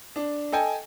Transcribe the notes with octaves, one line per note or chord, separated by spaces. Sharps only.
D4
A4 D#5 G5 G#5